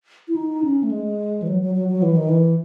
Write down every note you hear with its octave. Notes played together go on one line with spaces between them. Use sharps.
E4
D#4
C#4
A3
G#3
E3
F#3
F#3
F#3
F#3
E3
D#3
E3